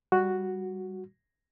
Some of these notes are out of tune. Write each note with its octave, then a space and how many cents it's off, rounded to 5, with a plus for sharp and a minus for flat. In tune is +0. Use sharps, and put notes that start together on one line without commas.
G3 +0 F#4 +0